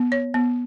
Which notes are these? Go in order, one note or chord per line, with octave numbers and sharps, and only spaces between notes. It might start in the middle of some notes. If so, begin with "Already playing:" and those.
Already playing: B3
C#5
B3